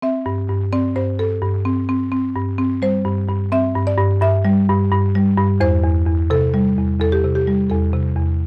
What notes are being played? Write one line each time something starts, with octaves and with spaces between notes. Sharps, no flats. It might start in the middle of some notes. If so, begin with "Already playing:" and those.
C4 E5
G2
G2
C4 D5
G2 C5
G2 A4
G2
C4
C4
C4
G2
C4
G3 C5
G2
G2
C4 E5
G2
D5
G2
G2 E5
G3
G2
G2
G3
G2
E2 C5
E2
E2
C3 A4
G3
E2
E2 A4
G4
C3
G4
G3
E2 A4
C3
E2